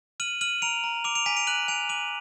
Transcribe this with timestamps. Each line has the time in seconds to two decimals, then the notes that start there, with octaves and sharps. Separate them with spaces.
0.20 F6 D#7 F#7
0.41 F6 D#7 F#7
0.62 A#5 D7 F7
0.84 A#5
1.04 D6 D7 F7
1.15 D7 F7
1.26 G#5 B6 D#7
1.37 D7 F7
1.47 F#6 D#7 F#7
1.68 G#5 D7 F7
1.89 D6 D#7 F#7